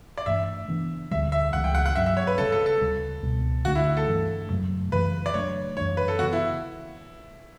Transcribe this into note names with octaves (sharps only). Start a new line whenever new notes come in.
D5
G2 E3 A3 D4 E5
C#3 E3 B3 D4
D2 D3 G3 E5
E5
C#2 C#3 E3 F#5
G5
F#5
F#5
G2 F#3 C#4 E5
E5
C#5
B4
C#3 G3 C#4 A4
A4
A4
D2 C#3 G3
C#2 B2 G3 B3
D2 D3 A3 D4 F#4
E4
A4
G2 E3 A3
F#2 C#3 F#3 A3
F#2 C#3 E3 B4
D5
C#3 F#3 A3 D4 C#5
F#2 E3 G3 D4 C#5
B4
A4
C#3 E3 B3 F#4
E4